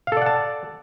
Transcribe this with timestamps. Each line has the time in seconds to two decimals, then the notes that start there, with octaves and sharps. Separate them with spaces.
0.07 F5
0.12 A4
0.17 D5
0.22 F#5
0.26 A5